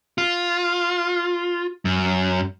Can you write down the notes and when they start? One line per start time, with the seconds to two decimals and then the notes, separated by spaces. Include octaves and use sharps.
0.18 F4
1.85 F#2